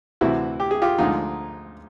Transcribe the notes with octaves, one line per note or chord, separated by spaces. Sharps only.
D2 C3 E3 E4 F#4
G4
G#4
F4 G4
D2 D3 F3 G#3 D#4 F4